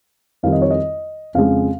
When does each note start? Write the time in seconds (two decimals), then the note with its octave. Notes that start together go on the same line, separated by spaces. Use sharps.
0.43 F2 D#3 G3 F5
0.52 D#5
0.62 C#5
0.71 D#5
1.34 F2 C#3 G#3 F5